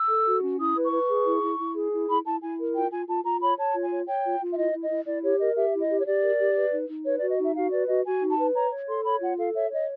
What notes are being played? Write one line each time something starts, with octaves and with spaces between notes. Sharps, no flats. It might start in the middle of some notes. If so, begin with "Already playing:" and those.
Already playing: E6
A4
F#4
C#4
E4 D#6
B4
C#6
B4
G#4
E4
E4
E4
G#4
E4
E4 B5
E4 A5
E4 G#5
A#4
F4 G5
F4 G#5
F4 A5
F4 A#5
C#5 B5
C#5 A5
F4
G#5
C#5
C#5 G5
F4
F4
E5
E4 D#5
E4
D#5
E4
E4 D5
G4 C#5
A#4 D#5
G4 E5
E4
D#5
G4
C#5
G4 D5
A#4
G4
B4
D#4
D#4
B4 C#5
F#4 D5
D#5
D#4 E5
F#4 F5
B4 D5
F#4 D#5
F#4 G#5
D#4
A5
B4
C#5 A#5
C#5
A4 C6
C#5 B5
F4 F#5
A4 F5
C#5 E5
C#5 D#5